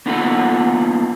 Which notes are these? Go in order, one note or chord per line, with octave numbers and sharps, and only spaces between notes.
A#3 B3 D#4 F4 A4 F#5